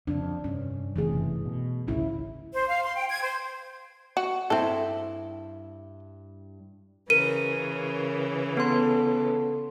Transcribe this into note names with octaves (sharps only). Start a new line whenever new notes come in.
F2 C#3 D4
G2 C3 C#4
F#1 G2 C3 E3 A3 G#4
B2
A1 D2 C#3 A3 C#4 E4
C5
F5
C6
G5
G#6
C5
F#4
G2 C4 E4 A4
C#3 E3 A#4 D#7
B3 A4 C6